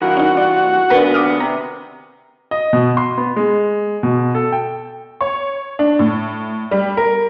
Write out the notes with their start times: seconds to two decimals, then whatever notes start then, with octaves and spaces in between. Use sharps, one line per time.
0.02 C2 G2 E3 F#4 A#4
0.17 C#4 D#4
0.37 F4 D5
0.90 D#2 B3 D4 A#4 B4
1.14 D6 D#6 F6
1.40 C3 A#5
2.51 D#5
2.73 B2
2.97 C6
3.18 B3
3.36 G#3
4.03 B2
4.35 A4
4.52 G5
5.21 C#5
5.79 D4
5.99 A2
6.71 G3
6.97 A#4